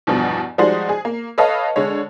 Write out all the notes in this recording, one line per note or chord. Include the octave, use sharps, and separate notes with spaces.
E2 G2 B2 F3
F3 G3 G#3 D#4 F#4 C5
G#4
A#3
A4 B4 C#5 D#5 F5 A5
D3 G#3 C#5